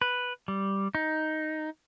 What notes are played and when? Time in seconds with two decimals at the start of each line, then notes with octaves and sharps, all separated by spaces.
0.01 B4
0.48 G3
0.95 D#4